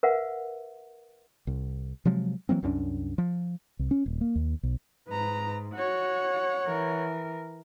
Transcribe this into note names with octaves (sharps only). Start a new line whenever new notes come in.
A#4 B4 E5 F#5
C2
C3 F3 F#3 G#3
E3 F#3 A#3 C4
C2 F#2 C#4 D4
F3
C2
C#4
D#1
A#3
D#2
B1
G#2 B4 A#5
F#4 C#5 F#5
E3 A#4